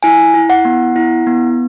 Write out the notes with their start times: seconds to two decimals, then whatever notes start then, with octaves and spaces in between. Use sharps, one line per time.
0.03 E4 G#5
0.34 E4
0.50 F#5
0.65 B3
0.96 E4
1.27 B3